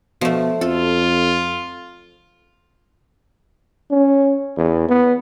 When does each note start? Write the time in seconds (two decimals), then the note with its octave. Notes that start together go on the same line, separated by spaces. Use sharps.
0.21 B2 F3 A3
0.61 F2 F4 A4
3.90 C#4
4.57 E2
4.89 B3